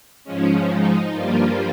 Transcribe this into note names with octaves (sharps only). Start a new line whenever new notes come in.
G#2 F3 G#3 C#4
D#4
G2 F3 G3 A#3 F4